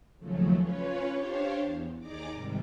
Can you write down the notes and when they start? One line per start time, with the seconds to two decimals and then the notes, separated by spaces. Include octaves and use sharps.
0.19 D#2 C#3 F3 F#3 A3
0.58 C#4 F4 B4 C#5
1.11 D4 G4 C5 C#5 F5
1.61 E2
1.98 D#2 D#4 G#4 D5 A#5 D6
2.32 G#2 C3 D#3 G3